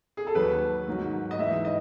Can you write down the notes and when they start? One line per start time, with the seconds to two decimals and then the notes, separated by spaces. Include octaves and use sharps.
0.17 G#4
0.27 A4
0.35 D#2 D#3 F#3 B4
0.88 G#2 D#3 F#3
1.31 D#5
1.39 G#2 E3 E5
1.65 D#5